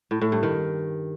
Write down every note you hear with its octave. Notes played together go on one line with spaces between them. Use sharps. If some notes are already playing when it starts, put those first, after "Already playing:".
A2
A2
G2
D#3